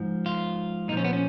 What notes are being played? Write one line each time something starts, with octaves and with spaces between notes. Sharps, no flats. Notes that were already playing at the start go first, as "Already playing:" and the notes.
Already playing: G#2 F3
F4
A#2 F3 C#4 D#4
B3
C#4